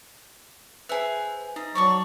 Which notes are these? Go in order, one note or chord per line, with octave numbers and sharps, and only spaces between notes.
G#4 B4 C5 E5
D#4 D#5
F#3 C#5 D5 A5 C#6